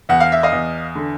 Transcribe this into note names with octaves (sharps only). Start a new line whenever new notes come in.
E2 F#5
F5
E5
D#5 F5
E2
D3